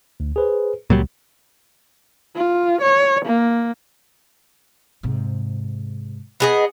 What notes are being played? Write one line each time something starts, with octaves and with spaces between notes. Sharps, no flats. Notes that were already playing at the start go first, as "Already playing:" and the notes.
D2
G#4 B4 C5
C#2 A#2 F#3 G3
F4
C#5
A#3
G#2 C3
B3 G#4 D#5